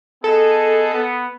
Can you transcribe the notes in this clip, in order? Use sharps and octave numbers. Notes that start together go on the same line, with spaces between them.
B3 G#4 A4 D#5
B3